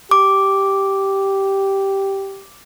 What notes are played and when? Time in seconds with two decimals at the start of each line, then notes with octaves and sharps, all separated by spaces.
0.11 G4 D6